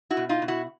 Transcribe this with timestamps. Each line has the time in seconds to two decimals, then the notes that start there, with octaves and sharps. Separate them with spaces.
0.10 E4 F#4
0.17 B2
0.29 D#4 F4
0.42 B2
0.48 E4 F#4